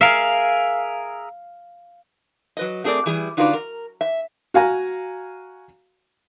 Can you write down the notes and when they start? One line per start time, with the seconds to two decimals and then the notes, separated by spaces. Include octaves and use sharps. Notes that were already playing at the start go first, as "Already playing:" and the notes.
0.01 G#4 A#4 E5 F5
2.57 F#3 B4 D#5
2.84 A3 C4 G#4 A#4 D5
3.06 E3 G3 E4 G#4
3.37 D3 D#4 F4 F#4 B4 D5
3.53 A#4
4.01 E5
4.54 F#4 F5 G#5 A#5